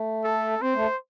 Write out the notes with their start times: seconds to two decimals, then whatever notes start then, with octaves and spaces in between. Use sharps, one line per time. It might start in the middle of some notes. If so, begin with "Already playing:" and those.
Already playing: A3
0.24 A4
0.62 C4 C5
0.75 A3